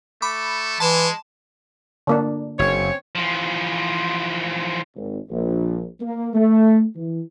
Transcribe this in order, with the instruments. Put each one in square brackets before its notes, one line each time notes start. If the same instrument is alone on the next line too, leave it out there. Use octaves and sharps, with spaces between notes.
[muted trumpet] A3 [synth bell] B5 D6
[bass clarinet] E3 [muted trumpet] G#3 [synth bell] A5 C6 E7
[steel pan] D3 A#3 D4
[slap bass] F#1 [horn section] C4 C#4 C#5
[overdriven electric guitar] E3 F3
[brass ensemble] G#1
A#1
A#3
A3
E3